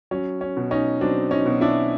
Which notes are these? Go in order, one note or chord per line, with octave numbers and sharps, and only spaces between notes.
F#3 C#4
C#4
B2
C#4 D#4
F#3 C4 D4
C#4 D#4
B2
D4 E4